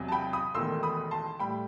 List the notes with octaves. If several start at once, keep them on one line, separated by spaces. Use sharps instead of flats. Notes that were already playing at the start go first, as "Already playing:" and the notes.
Already playing: E1 E2 C3 F#3
A5
G5 B5
B5 D#6
E1 E2 D#3 A3 C6 E6
B5 D#6
A5 C6
A2 G3 G5 B5